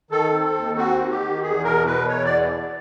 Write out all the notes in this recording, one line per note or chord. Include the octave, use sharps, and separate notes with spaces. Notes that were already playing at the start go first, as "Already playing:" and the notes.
D#3 A4
C4
D#2
C4 F#4
D#3
G4
D#3
E2 G#4
B2 A#4
B2 B4
E2 C#5
D5